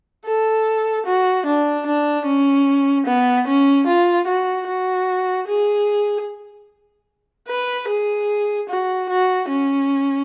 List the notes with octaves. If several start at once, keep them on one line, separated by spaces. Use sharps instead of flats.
A4
F#4
D4
D4
C#4
B3
C#4
F4
F#4
F#4
G#4
B4
G#4
F#4
F#4
C#4